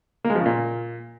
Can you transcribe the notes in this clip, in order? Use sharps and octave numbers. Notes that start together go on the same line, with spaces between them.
A#3
G#3
F3
C#3
A#2